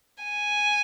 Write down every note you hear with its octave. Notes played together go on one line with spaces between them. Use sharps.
G#5